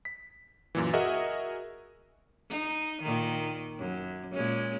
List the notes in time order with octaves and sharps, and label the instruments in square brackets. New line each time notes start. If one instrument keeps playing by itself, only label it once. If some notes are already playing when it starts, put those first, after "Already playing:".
[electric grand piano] B6
F#2 A#2 E3
F#4 G#4 A#4 D#5 E5 F#5
[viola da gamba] D#4
A#2 D#3
F#2
A#2 G#3 C#4